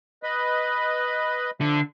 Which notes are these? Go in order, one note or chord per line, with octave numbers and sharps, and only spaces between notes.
B4 D#5 B5
D3 F3 E5